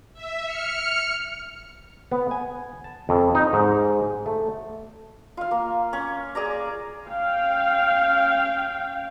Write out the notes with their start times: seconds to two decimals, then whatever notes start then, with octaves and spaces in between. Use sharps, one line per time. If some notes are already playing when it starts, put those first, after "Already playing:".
0.14 E5
0.45 F6 C#7
2.12 B3
2.31 G#5
2.84 A5
3.09 F2
3.35 D#4
3.53 G#2
4.26 A3
5.37 F4 F5
5.51 A#3
5.93 C#4
6.35 G#4 D5 A#5
7.07 C#4 F5 G5